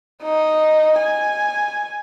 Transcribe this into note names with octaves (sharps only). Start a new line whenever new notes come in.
D#4
G#5